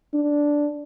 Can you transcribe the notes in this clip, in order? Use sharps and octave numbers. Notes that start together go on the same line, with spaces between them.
D4